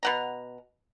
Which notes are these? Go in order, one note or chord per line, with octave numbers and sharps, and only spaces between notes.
B2 F#5 A#5